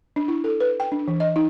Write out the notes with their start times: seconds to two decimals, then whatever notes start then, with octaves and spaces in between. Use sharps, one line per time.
0.16 D4
0.28 E4
0.44 A4
0.60 B4
0.80 G5
0.92 D4
1.08 E3
1.20 D#5
1.36 D#4